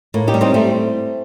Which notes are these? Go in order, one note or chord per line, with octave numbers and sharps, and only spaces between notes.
A2 A#3
D#4 G4
G3
C4 D#4
G3 A3 C4